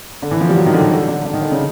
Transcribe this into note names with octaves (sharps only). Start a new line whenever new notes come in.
D3
E3
F3
G3
F#3
D#3
D3
D#3
D3
D3
D3
D#3
D3
C#3